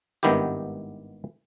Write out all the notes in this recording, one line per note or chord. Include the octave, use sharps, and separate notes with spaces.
G#1 G2 D#3 B3 E4 G4